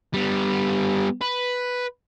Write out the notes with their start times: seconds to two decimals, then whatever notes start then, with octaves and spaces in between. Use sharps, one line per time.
0.14 G3 B3
1.21 B4